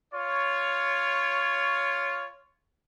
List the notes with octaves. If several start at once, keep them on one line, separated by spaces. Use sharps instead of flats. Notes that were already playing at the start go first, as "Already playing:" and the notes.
F4 C#5